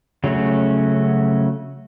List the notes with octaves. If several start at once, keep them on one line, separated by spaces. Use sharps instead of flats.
C#3 F#3 A3 C#4 F#4